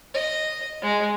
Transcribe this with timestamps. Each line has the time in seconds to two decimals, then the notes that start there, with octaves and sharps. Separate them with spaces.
0.14 D#5
0.82 G#3